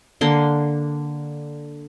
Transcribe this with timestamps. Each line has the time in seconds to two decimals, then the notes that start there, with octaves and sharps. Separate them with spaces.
0.21 D3 A#3 C6